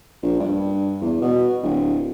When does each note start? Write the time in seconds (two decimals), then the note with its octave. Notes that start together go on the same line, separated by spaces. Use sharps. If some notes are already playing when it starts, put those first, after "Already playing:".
0.23 A#1
0.39 G2
1.01 E2
1.22 B2
1.63 D1